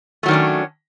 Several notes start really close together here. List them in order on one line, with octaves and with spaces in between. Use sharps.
A3 F#3 D#3 D4 C#4